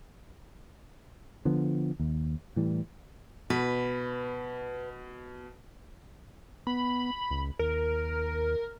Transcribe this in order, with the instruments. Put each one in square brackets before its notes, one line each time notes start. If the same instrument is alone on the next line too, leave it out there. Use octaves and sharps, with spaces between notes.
[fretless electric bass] D3 F3 B3
D#2
A2 E3 G3
[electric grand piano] B2 [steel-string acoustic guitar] B4
[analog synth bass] B3 [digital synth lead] B5
[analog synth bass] C#2
[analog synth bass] D#2 [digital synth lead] A#4